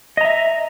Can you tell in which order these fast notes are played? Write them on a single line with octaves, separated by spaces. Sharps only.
D#5 A#5 E5